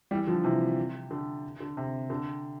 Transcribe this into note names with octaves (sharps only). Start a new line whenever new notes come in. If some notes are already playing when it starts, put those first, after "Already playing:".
E3 G3
D3 F3
C3 E3
D3
D3
C3
D3